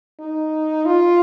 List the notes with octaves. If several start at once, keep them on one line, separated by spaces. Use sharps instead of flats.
D#4
F4